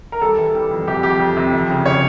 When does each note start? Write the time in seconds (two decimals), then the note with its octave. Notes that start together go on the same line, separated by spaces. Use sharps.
0.12 A#4
0.21 G3 A4
0.37 E3
0.55 G3
0.71 F2
0.87 C3 G4
1.03 F2 G4
1.20 F2
1.36 C3
1.53 F2
1.70 C#3
1.86 C#3 C#5